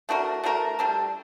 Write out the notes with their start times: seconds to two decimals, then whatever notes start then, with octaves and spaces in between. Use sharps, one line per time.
0.09 A3 D4 F#4 A#4
0.44 A3 D4 F#4 A#4
0.79 G3 D4 A4